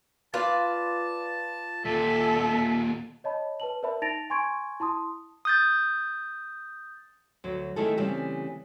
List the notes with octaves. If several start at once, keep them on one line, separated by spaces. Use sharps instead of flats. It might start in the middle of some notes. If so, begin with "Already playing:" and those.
F4 B4 D5 A5
D#2 A#2 A4 E5
C#5 D#5 A5 B5
B4 A5 F#7
A#4 C5 D5 E5 A5 B5
D#4 A5 A6 A#6 D7 F7
G#5 C6 C#6 G#6 D7
E4 A5 C6 D#6
D#6 G6 A6
D2 F#3
D#3 A3 E4 G#4 A4
C#3 E3 G3 A3 C4